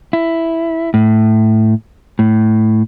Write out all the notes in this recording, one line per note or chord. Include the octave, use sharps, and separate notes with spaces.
E4
A2
A2